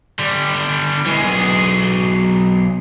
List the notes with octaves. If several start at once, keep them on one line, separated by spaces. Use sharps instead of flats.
D3 G3
E3 G#3
B1 G#4